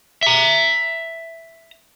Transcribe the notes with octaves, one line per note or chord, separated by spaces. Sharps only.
E5 A#5